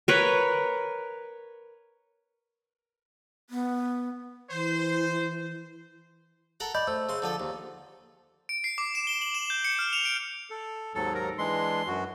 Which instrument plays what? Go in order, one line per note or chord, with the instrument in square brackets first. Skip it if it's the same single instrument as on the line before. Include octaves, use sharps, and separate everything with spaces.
[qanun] A#4 B4 C#5
[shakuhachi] B3
[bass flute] E3 [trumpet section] C5
[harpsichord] A4 A#4 F#5
[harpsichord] D5 [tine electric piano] D#5 B5 G6
[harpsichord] A3 [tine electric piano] C5 E6
[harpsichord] C#3 C6
D3 F3 A4
D#2
[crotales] D7
C7
D6
E7
G7
F#7
E7
G6
C#7
F6
F7
D7
[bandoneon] A4
[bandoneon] D#2 G#2 F#3 [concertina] A4
[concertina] A#4
[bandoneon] E3 G#3 D4 [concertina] C6
[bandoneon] F#2 F#4